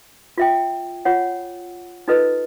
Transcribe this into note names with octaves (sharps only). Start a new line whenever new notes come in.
F4 E5 G5
F4 C#5 F#5
D#4 F4 A4 B4 D#5